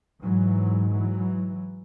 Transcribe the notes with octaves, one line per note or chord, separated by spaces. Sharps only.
G#2 E3 F#3
E3 F#3